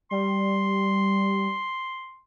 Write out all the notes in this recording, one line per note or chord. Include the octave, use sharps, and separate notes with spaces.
G3 C6